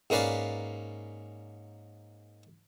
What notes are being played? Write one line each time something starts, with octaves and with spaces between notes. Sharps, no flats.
G#2 A#3 C#4 B4 D5 F5